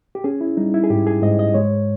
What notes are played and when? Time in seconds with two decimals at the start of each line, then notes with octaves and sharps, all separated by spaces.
0.15 G4
0.24 C#4 G#4
0.41 E4
0.57 G3 D#4
0.74 E4
0.84 G#4
0.90 G#2 G4
1.07 G#4
1.22 G#2 D#5
1.39 D#5
1.54 G#3 C#5